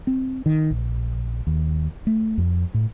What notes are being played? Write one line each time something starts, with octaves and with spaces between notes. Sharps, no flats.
C4
D#3
A#1
D#2
A3
F2
A2